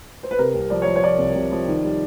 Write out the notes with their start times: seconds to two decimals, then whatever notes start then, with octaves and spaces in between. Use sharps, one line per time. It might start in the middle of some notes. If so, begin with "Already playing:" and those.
0.23 C5
0.31 B4
0.39 C3 A#4
0.54 C2
0.70 F3 D5
0.82 C#5
0.87 F3
0.96 C#5
1.03 F3 D5
1.19 C2
1.35 C3
1.52 F3
1.68 D#3
1.84 G3